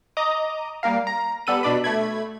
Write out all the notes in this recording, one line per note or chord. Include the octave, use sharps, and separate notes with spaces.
D#5 A#5 D6 D#6
G3 A#3 A#4 F5
A#5
G3 B3 A4 B5 D#7
B2 D4 D5 B5
A3 B5 G#6